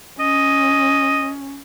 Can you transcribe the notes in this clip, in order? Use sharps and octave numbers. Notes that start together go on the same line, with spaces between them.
C#4 D#5